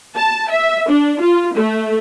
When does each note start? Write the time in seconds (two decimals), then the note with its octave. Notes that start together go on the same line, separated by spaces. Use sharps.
0.17 A5
0.51 E5
0.90 D4
1.21 F4
1.56 A3